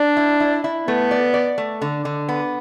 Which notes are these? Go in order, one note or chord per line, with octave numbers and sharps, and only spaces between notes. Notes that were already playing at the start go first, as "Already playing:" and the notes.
Already playing: D4
E4
E4
E4
A3 B3
D5
D5
A3
D3
D3
B3